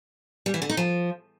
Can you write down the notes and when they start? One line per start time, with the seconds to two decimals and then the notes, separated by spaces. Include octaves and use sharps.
0.46 G3
0.54 E3
0.62 D3
0.69 D#4
0.77 F3